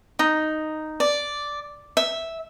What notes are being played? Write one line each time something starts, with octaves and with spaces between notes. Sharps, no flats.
D#4
D5
E5